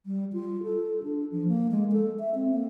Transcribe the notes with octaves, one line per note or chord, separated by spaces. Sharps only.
G3
F4
A4
D4
F3
A#3
G#3
A4
E5
C4
A#3